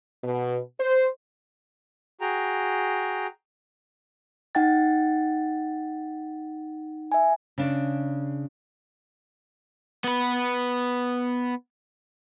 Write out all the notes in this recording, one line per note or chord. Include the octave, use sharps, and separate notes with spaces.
B2
C5
F#4 G#4 G5 A#5
D#4 F#5 G5 A6
E5 G#5
C#3 D4
B3 B4